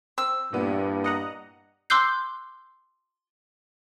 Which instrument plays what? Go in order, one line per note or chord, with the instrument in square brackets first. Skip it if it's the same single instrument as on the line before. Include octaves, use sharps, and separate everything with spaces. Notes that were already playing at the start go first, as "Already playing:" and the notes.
[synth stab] C4 [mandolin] E6
[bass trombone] G2 [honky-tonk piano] A#2 B3 E4
[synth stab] D#5 F#5 A#5
[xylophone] C6 D6 E6 F#6 G6 C7